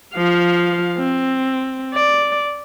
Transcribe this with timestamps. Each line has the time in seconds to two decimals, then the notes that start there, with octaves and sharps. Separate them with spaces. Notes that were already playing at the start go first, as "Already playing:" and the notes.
0.15 F3 F5
0.98 C4
1.94 D5